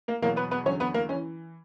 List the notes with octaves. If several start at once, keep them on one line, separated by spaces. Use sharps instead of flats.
A#3 A#4
E2 B2 F#3 A#3 A#4
B3 B4
B3 B4
E2 D3 F#3 C#4 C#5
B3 B4
A#3 A#4
C#4
E3